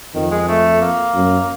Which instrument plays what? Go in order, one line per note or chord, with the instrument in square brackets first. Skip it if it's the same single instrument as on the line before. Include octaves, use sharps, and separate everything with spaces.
[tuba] F2 [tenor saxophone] D#3
[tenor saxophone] G#3
A3
A#3
[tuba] F#2